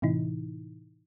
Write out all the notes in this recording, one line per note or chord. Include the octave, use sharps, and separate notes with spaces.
A2 C3 E3 D#4 E4